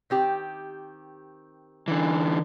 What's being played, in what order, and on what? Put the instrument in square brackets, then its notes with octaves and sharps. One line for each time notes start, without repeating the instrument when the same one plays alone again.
[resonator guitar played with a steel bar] D#3 C4 G4
[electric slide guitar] D3 E3